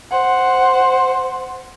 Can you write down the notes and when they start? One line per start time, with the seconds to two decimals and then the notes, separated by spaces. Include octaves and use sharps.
0.11 C5 F#5